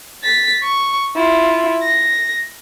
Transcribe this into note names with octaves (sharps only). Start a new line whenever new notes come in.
A6 B6
C#6
E4 F4
A#6